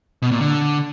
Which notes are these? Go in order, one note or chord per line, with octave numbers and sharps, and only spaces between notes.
B2
A#2
D3